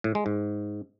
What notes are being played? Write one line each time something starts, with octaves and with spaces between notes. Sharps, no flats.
A2
G#3
G#2